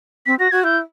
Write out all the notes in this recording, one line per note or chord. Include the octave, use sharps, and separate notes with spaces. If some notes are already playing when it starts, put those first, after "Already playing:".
C4 B6
F#4 A#6
F#4 G#6
E4 G6